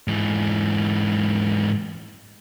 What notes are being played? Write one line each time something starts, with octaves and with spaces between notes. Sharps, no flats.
G#2 E3